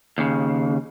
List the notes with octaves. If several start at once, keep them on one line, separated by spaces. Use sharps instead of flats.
D#2 C#3